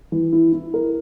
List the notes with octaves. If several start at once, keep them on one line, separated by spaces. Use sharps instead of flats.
E3
E4
E4
A#4